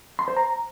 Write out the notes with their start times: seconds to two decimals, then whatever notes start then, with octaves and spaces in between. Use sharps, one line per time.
0.19 C6
0.28 C5
0.37 A#5